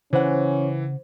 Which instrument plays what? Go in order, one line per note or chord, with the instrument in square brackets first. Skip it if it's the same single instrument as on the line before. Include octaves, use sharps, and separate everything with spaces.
[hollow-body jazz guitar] C#3 F#5 [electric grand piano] E3 [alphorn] C#4 [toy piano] C5